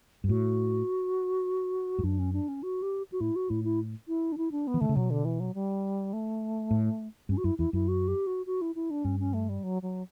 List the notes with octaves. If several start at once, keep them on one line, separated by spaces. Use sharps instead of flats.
G2
A2 F#4
G2
F#2 D4
C#4
D4
C#4
F#4
G4
F#4
A2 E4
F#4
A2 E4
E4
E4
D4
E4
D4
B3
E3
D3 A3
C#3
B2 F#3
D3
E3
F#3
G3
A3
A2
G2 C#4
F#4
F#2 E4
E2 E4
F#2 E4
F#4
G4
F#4
F#4
E4
E4
D4
G2 C#4
C#4
A3
G3
F#3
F#3